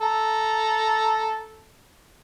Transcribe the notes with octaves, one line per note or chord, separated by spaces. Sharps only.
A4 A#5